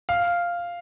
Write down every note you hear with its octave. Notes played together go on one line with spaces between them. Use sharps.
F5